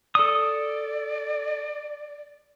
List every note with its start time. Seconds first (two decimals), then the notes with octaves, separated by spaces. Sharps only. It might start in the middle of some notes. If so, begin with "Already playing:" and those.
0.15 A4 D5 D#6